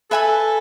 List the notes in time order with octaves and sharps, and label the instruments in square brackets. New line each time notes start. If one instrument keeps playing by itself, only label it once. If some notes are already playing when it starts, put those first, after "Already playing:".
[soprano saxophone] A4 [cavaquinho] B4 E5 G#5 B5